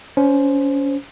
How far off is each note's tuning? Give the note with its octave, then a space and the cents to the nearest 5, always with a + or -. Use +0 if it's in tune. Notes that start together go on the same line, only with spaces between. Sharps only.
C#4 +25 C5 +0